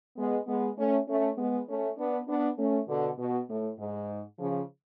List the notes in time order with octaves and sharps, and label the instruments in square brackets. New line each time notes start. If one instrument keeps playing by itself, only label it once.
[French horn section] G#3 B3
G#3 B3
A3 C#4
A3 C#4
G#3 B3
A3 C#4
B3 D4
B3 D4
A3 C#4
B2 D3
B2
A2
G#2
C#3 F3